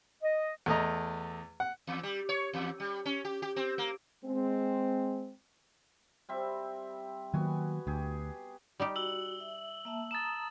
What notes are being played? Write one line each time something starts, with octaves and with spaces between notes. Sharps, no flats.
D#5
E2 A3 D#5 A#5
F#5
E2
G3
C#5
E2
G3
C#4
G4
G4
C4
A#3
G#3 C4
G3 C4 E5
D#3 F#3 A#3 B3 F#4 G#5
D2 G4 G#4
G3 D#4 G4
F#4 E6 F#7 G7
E5
A#3 E5 A5
A5 A#5 D#6 A6 E7